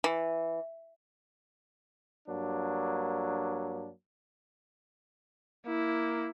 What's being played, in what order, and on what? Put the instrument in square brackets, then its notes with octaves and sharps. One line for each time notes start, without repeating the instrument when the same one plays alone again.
[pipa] E3
[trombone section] G2 F#3 A#3 D4
[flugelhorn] A#3 [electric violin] E4